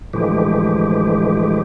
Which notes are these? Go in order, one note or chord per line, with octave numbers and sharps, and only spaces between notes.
A2 D3 E3 F3 G#3 G4